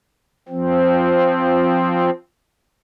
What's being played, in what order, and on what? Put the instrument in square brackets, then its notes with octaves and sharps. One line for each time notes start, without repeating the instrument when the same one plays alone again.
[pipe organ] F3 C4